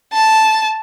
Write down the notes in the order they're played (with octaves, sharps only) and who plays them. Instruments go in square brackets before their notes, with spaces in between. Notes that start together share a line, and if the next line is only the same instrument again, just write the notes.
[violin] A5